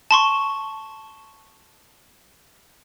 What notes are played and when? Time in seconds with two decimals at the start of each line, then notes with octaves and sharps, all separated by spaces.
0.11 A5 C6 C#6